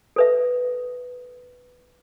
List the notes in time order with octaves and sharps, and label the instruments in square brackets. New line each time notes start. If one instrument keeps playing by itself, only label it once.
[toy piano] A4 B4 E5